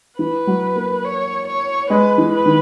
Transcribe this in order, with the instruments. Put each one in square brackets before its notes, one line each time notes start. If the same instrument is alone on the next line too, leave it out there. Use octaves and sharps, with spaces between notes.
[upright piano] E3 [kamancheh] B4
[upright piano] F#3
A#3
[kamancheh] C#5
C#5
[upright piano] G#3 [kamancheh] B4
[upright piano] E3
[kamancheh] B4
[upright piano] D#3